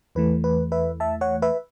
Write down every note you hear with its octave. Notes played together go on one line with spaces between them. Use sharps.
E2 E3 A3 B4
B4
B4 E5
E5 A5
C#5 F#5
B4 E5